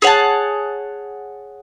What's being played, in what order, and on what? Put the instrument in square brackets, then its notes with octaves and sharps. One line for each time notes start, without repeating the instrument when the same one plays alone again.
[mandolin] G#4 C#5 F#5 A5